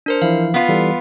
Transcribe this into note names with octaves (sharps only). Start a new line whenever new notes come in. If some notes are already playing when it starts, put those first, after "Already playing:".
D4 A#4 C5
E3 F3 E4 F5
B3 F4
E3 G3 A4